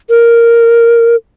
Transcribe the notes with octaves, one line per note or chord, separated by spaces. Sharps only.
A#4